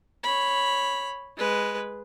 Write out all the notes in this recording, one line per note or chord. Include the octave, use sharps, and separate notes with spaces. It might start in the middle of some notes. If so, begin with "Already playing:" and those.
C#5 B5
G#3 B4